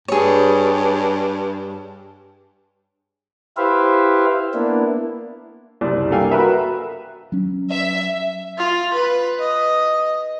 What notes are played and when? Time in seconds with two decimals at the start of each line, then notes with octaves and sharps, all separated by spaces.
0.08 G2 G#4 C#5
3.57 E4 G4 B4 C5 E5 F5
4.54 A#3 B3 D4 E4
5.81 F#1 C2 D5
6.11 A#3 D4 A4 F5 G5 G#5
6.31 F#4 A#4 B4 E5
7.32 F#3 C#4
7.72 E5
8.58 F4
8.94 B4
9.39 D#5